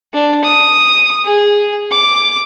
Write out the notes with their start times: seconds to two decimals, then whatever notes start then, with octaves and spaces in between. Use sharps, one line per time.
0.13 D4
0.44 D#6
1.25 G#4
1.91 D6